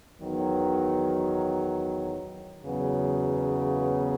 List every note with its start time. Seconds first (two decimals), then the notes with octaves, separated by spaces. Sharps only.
0.19 E2 D#3 F#3 B3
2.63 E2 C#3 F#3 B3